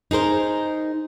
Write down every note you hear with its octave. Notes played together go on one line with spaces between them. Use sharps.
D#4 G#4 A#4 C5